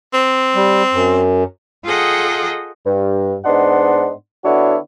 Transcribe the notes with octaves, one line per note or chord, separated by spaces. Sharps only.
C4
G3
F#2
F4 G#4 A4 D#5 F#5 G5
G2
G#2 B3 D4 D#4 F#5 C6
D3 B3 D4 E4 F#4 C#5